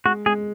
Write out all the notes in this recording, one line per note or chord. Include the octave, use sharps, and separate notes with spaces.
G#3 F#4
G#3 G#4